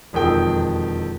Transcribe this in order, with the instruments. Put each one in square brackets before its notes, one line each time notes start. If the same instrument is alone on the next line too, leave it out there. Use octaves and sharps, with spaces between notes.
[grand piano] E1 F2 D#3 A4 G5 D#6